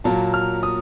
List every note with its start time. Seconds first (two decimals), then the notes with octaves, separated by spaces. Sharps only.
0.04 A#2 F#3 A#3 A5
0.34 F6
0.63 D#6